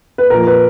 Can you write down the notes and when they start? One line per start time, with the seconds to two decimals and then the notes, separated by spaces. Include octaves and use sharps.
0.18 B4
0.30 A#2 F3 A#4
0.47 B4